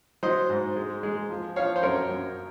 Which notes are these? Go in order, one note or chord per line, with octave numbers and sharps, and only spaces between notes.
F#3 C5 D#5
G#2
G#3
G#3
F3
F3 C#5 F5
C5
F#2 A#4 C#5
F#2